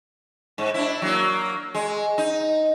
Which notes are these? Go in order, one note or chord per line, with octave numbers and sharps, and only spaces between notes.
G#2
D4 E4
F#3 A#3
G#3
D#4